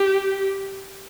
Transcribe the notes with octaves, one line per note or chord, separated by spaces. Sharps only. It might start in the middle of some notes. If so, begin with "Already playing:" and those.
Already playing: G4